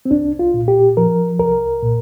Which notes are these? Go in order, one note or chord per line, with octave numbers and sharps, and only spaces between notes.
C4
C2 D4
F4
A#2
G4
F3 A#4
C2 A#4
A#2